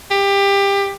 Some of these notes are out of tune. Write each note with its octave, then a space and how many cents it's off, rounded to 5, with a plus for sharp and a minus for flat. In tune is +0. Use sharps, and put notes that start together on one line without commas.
G4 +20